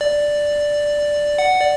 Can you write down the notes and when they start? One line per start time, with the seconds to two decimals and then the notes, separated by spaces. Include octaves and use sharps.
0.01 D5
1.38 F#5
1.61 D5